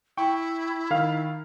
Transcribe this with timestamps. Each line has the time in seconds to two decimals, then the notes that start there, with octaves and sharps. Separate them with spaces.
0.17 E4 G5 C#6
0.90 D#3 F5 F6